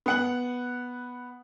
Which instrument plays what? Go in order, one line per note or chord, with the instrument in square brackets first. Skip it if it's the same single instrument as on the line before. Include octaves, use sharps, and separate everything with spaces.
[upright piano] B3 F#5 F#7